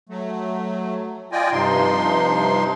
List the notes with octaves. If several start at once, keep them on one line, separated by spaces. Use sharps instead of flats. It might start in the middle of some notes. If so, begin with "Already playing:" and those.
F#3 A3
F4 D5 D#5 G5 G#5
G2 C3 F3 D#4 C6